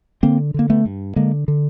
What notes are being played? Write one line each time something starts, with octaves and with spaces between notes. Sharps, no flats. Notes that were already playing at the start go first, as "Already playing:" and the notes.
D3 A#3 C4
D3 A#3
A3 B3
G2
D3 G#3 A#3
D3